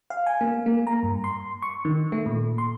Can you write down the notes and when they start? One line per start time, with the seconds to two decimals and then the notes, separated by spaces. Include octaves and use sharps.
0.10 F5
0.26 G#5
0.41 A#3
0.66 A#3
0.87 A#5
1.03 G2
1.24 C6
1.62 C#6
1.85 D#3
2.12 A3
2.26 A#2
2.58 C6